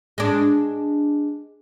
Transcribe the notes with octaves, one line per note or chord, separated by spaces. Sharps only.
G#3 D4